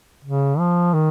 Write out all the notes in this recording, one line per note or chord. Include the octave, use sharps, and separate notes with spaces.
C#3
F3
D#3